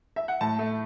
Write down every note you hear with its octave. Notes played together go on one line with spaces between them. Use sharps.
E5
F#5
A2 A5
A3